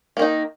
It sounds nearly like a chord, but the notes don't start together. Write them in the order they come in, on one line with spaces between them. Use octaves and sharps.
A#3 D#3 D#4